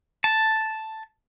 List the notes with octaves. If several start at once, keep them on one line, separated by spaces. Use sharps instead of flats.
A5